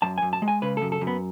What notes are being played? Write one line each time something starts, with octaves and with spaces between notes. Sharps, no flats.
F#2 A5
F#2 G#5
A5
G#3
G#5
C#3 B4
F#2 A4
A4
F#2
B3